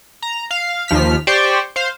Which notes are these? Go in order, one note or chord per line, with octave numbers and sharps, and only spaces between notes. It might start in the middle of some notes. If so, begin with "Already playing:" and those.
A#5
F5
D#2 F3 F6 B6
G4 C5 D5 G5 C#6
C5 F5